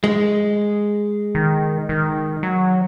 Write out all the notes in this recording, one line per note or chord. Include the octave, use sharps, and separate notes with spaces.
G#3
D#3
D#3
F#3